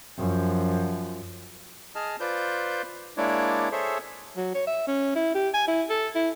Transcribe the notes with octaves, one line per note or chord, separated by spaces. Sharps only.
F#2 F3
G#4 D#5 A5 F6
F4 B4 C5 D5 G6
G#3 A#3 D4 E4 C#5 D5
G#4 A4 C5 C#5 E5
F#3
C#5
E5
C#4
E4
G4
G#5
E4
A4
E4